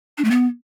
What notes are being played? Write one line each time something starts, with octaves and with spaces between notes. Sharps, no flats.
D4
A3
B3